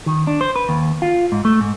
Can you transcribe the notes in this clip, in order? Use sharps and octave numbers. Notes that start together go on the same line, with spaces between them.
D#3
D4
C5
B4
D#2
F4
G#2
A3
G#2